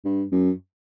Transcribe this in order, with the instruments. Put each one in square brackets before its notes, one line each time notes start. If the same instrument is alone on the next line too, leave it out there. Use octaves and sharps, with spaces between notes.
[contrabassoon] G2
F#2